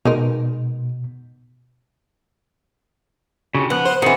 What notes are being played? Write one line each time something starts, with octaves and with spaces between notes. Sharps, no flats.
B2 G#3 D#4 A#4
C#3 D#4 F#4 G4
F3 B3 F#5 F#6
C5
D#3 E3 C4 G#4 F#5